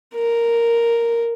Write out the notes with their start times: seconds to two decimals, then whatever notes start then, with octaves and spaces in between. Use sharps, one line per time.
0.15 A#4